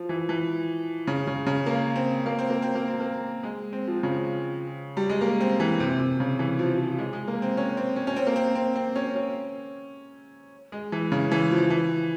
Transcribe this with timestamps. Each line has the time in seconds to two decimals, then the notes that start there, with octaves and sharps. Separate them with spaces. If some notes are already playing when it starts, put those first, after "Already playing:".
Already playing: F3
0.09 E3
0.29 E3
1.07 C#3
1.27 C#3
1.46 C#3
1.66 A#3
1.96 C4
2.26 A#3
2.39 C4
2.50 A#3
2.62 C4
2.75 A#3
2.88 C4
3.00 A#3
3.43 G#3
3.73 C4
3.87 F3
4.03 C#3
4.97 G3
5.09 G#3
5.21 A#3
5.41 C4
5.60 E3
5.80 C3
6.00 C3
6.20 C#3
6.39 E3
6.59 F3
6.78 F3
6.98 G#3
7.13 G#3
7.28 A#3
7.42 C4
7.57 C#4
7.77 C4
7.96 C#4
8.07 C#4
8.16 C4
8.27 A#3
8.36 C4
8.55 C4
8.76 C4
8.96 C#4
9.15 C#4
10.72 G#3
10.92 E3
11.12 C#3
11.32 E3
11.51 F3
11.70 E3